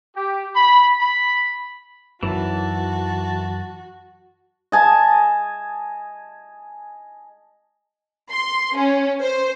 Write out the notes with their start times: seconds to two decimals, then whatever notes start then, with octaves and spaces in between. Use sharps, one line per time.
0.15 G4
0.55 B5
1.00 B5
2.23 F#2 D#3 E3 F#4 A5
4.72 D#5 G#5 A5
8.30 C6
8.75 C#4
9.21 C5